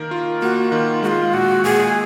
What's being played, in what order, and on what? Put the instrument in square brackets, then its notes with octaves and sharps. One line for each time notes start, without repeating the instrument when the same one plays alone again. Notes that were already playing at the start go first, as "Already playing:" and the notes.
Already playing: [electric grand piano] D#3 A#3 A#4
F4
[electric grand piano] A#3 [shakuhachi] F#4
[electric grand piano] D#3 [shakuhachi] F4
[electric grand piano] G#3 [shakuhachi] F#4
[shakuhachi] F4
[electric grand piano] A#2 [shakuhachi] F#4
[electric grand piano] A#2 [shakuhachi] G#4